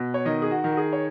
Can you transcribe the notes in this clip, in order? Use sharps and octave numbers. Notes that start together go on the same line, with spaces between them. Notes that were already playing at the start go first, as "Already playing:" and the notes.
Already playing: B2
C#5
D#3 D#5
G#4
F#4
D#3
F#4
G#4
C#5